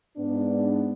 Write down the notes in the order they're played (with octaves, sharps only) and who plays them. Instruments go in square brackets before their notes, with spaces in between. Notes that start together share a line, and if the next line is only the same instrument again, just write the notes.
[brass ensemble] G#2 B3 D4